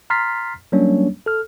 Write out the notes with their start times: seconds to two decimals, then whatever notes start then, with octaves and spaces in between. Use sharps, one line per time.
0.10 A#5 C6 F6 A6 B6 C7
0.72 F#3 G3 A#3 C#4 D4 C#5
1.26 A4 F6